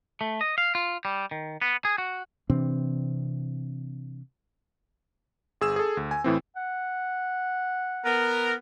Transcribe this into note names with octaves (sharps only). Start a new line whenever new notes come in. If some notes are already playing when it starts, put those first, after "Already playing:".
A3
D#5
F5
F4
G3
D#3
B3
G#4
F#4
C3 E3 C4 D4
G1 G#4 E6 E7
G#4 A4
D2
G#5
A2 E3 C4
F#5
B3 A#4